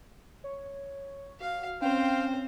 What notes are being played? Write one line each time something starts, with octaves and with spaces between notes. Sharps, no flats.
C#5
F#4 F5
C4 C#4 C5 F5 G5